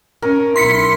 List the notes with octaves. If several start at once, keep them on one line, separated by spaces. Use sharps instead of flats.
C#4 A#4
B1 E4 C6 B6 C#7